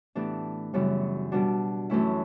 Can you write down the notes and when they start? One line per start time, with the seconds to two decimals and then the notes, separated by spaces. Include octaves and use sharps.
0.15 A2 E3 B3 D4 G4
0.73 F#2 C#3 E3 G3 B3
1.32 B2 G3 D4 F#4
1.90 F#2 E3 A3 C#4 E4